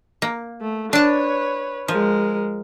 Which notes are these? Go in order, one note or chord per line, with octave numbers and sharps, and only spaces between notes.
A#3
A3
D4 B4 C#5 A5
F3 G#3 A#4